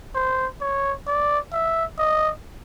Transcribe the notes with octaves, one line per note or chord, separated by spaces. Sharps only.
C5
C#5
D5
E5
D#5